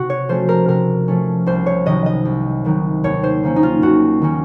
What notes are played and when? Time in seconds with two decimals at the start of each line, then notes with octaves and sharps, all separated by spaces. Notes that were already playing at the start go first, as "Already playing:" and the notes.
Already playing: C3 F#4
0.10 C#5
0.29 F3 A3 C#4 C5
0.49 A#4
0.68 C3 A#4
1.08 F3 A3 C#4
1.46 C2 C5
1.66 C#5
1.86 C3 D#3 F#3 D#5
2.06 D#5
2.25 C2
2.65 C3 D#3 F#3
3.04 D#2 C#5
3.24 C5
3.43 D#3 A#3 C#4
3.56 D#4
3.63 F4
3.82 D#2 F#4
4.22 D#3 A#3 C#4